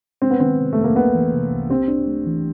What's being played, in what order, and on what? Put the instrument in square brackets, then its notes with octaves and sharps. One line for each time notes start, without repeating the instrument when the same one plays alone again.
[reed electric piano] G#3 [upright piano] C4
[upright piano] B3
[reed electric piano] D#3 [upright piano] C4
[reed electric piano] C3
[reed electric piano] F2 [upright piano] A3
[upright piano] A#3
[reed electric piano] C2 [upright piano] B3
[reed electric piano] E3
C3
C2
[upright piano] C4 [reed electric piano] G4
[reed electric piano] D4
A3
E3